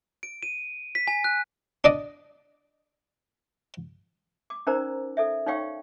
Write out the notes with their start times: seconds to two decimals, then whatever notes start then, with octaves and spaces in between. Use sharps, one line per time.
0.23 D7
0.43 D#7
0.95 B6
1.08 G#5
1.24 F#6
1.84 D4 D5 D#5
4.50 D6
4.67 C#4 D#4 A#4 C5 D5 A#5
5.17 A4 D5 E5
5.47 D#4 C#5 D5 F5 G5 C#6